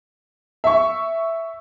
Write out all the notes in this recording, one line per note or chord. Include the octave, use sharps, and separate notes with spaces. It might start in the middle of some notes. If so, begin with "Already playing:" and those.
E5 C#6